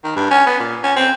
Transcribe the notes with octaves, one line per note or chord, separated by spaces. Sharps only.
D#3
G2
C#4
B3
A#2
C#4
C4